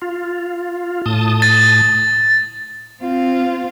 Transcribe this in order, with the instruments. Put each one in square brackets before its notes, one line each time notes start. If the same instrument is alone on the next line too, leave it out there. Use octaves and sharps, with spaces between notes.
[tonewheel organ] F4
A2 A5 D#6
[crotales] A6
[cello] C4 F4